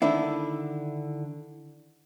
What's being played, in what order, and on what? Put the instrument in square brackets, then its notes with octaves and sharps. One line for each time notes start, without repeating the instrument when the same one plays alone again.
[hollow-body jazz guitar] D3 D#3 D4 E4